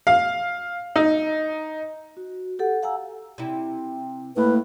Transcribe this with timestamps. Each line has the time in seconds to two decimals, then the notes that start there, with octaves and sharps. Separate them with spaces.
0.07 F5
0.96 D#4
2.17 F#4
2.59 G4 A4 F#5
2.83 F5 F#5 G#5 A#5 E6
3.38 C3 E4
4.36 A2 A#3 B4